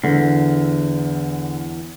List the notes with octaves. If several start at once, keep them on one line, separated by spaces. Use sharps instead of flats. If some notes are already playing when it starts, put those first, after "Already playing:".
E2 D3